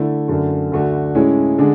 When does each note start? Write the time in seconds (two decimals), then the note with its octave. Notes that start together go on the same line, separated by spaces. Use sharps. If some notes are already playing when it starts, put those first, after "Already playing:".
Already playing: D3 A3 E4
0.28 F#2 D3 A3
0.71 D2 D3 A3 D4 F#4
1.15 A2 G#3 C#4 E4
1.58 D3 G#3 D4